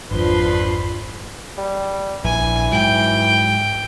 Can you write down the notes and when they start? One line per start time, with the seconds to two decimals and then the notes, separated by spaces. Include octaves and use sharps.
0.11 G#1 F2 F3 D4 B4 C6
1.58 G3
2.24 A#1 E3 G#5
2.72 G#2 F#3 G5